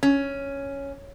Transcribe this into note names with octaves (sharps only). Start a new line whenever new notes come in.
C#4